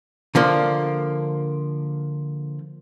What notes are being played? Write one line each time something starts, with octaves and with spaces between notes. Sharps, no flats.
D3 F3 A#3